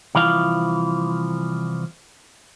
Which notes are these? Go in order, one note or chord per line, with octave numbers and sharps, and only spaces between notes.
C2 E3 F3 F5